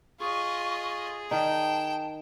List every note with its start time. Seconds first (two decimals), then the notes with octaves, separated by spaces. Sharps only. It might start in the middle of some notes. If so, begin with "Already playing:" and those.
0.20 F4 G#4 D#5 C#6
1.31 D#3 D#4 G5 A5